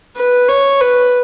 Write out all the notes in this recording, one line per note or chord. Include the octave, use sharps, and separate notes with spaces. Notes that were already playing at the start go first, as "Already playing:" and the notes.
B4
C#5
B4